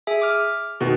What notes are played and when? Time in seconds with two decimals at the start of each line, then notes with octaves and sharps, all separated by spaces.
0.07 G#4 E5 G#5
0.22 D6 F6
0.80 B2 D#3